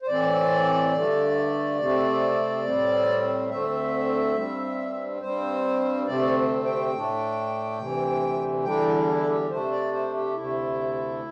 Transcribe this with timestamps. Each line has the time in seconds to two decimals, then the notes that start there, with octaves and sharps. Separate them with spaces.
0.02 C5
0.07 A2 E3 C4 D5
0.92 G2 D3 A3
1.79 C3 A3 C4
2.64 A2 G3 C4
3.50 D2 D3 A3 C4 E5
4.35 G2 G3 C4
5.21 G2 G3 C4 C5
6.07 D2 C3 A3 C4 D5
6.64 G5
6.93 A2 A3 D4
7.78 D2 C3 E3
8.64 E2 D3 G3 D4 G5
9.07 E4
9.20 A4
9.28 G4
9.50 C3 A3 D4 C5
9.71 D5
9.92 C5
10.14 G4
10.35 D2 C3 A3 E4